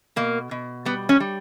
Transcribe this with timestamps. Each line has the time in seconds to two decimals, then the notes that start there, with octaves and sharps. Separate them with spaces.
0.16 B2 A#3
0.51 B2
0.85 G3 B3
1.09 C#4
1.20 G3